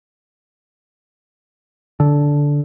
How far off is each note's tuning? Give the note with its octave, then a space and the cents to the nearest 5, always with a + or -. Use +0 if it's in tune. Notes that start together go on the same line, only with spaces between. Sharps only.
D3 -10